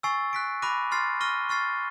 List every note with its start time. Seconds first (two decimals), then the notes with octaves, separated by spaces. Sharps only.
0.03 G#5 C#6 E6 A6 C7
0.33 F#6 B6 D7
0.62 B5 D6 F#6 A#6 D#7
0.91 C6 F6 A6 C7
1.21 C#6 F6 A#6 D#7 G7
1.49 C#6 F6 A6 C7